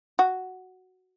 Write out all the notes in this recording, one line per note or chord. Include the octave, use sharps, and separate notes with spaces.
F#4